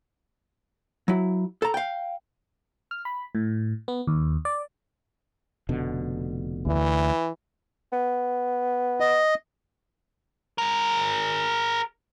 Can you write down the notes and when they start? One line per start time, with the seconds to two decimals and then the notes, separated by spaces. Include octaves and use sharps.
1.08 F#3 E4
1.62 A4 A#5
1.74 F5 G5
2.91 F6
3.05 B5
3.35 A2
3.88 B3
4.07 D#2
4.45 D5
5.69 F1 B2 D3
6.66 D2 E3
7.93 B3
9.00 D#5
10.58 G#4 A#4